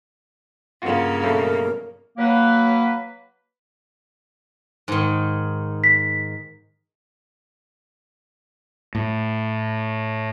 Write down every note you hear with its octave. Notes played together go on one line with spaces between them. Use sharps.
G2 C#3 A#3 F4 F#4
B1 B2 A3 A#4
F#3 A#3 B4
G#2 D#3
B6
A2